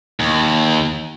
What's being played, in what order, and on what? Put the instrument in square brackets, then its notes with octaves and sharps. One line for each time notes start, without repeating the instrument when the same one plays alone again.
[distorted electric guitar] D#2